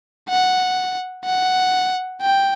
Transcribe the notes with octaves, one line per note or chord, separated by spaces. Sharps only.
F#5
F#5
G5